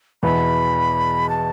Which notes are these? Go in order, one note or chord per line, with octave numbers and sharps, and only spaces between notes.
E2 B2 B3 E4 B5
A5